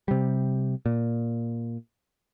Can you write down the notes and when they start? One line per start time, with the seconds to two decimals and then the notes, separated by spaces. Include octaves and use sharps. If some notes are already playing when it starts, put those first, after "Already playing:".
0.08 C3 G3
0.86 A#2